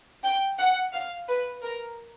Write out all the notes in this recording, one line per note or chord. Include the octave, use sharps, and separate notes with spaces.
G5
F#5
F5
B4
A#4